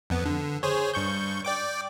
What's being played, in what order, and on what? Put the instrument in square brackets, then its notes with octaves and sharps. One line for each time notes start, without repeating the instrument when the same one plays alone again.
[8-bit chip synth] F2 B3
D3
G#4 C5 C#5
G2 C#6 G6
D5 G5 D6